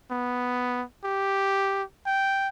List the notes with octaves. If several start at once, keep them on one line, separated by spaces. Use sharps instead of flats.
B3
G4
G5